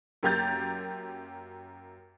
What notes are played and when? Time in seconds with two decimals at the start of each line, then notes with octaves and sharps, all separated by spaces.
0.23 F#2 A#3 G4 A#5 G6 A6